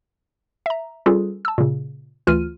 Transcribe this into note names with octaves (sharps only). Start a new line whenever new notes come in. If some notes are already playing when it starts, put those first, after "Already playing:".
E5 A#5
G3 C#4 F4 G#4 A4 B4
A5 E6
A#2 C#3
D2 E3 F4 F6 D#7